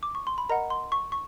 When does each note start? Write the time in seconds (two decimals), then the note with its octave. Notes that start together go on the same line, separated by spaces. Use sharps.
0.03 D6
0.15 C#6
0.27 C6
0.38 B5
0.49 A#4 D#5 F#5 A#5
0.70 C6
0.92 C#6
1.12 C#6